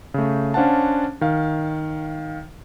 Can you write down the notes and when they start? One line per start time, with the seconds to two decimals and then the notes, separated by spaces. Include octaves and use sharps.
0.14 C#3 A3
0.54 C#4 D4 C5 F5 F#5 A5
1.21 D#3 F5